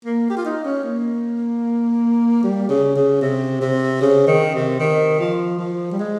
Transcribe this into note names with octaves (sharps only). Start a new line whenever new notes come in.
A#3
G4
F4
D#4
C#4
A#3
G3
C#3
C#3
C3
C3
C#3
D#3
C3
D#3
F3
F3
G3
G#3